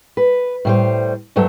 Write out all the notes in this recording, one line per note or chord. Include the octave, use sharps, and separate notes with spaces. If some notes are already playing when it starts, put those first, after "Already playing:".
B4
A2 G3 C5
D2 G2 F#3 A3